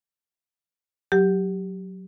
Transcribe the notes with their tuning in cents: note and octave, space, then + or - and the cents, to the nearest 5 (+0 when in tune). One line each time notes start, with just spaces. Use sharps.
F#3 +5 G4 -5